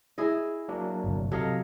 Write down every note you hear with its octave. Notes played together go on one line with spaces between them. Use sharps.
E4 G#4 D#5
F#3 A#3 D4
G1 C2
C3 F#3 A4 D#5 F5